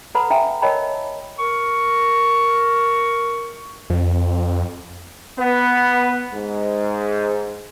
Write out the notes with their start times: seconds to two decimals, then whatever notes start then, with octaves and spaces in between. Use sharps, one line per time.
0.15 A4 B4 F#5 A#5 B5
0.30 E5 G5 G#5 A#5
0.62 A#4 C#5 D#5 G5 A5 B5
1.39 A#4 C#6
3.90 F2
5.38 B3
6.32 G#2